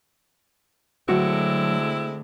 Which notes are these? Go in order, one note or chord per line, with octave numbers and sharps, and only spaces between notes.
D3 F#3 G#3 A3 C4 E4 F#4